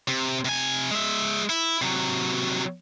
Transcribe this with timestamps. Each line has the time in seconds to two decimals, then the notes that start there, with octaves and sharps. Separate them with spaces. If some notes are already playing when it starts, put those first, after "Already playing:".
0.08 C3
0.45 C3 G#5
0.91 G#3 E5
1.49 E4
1.82 C3 F#3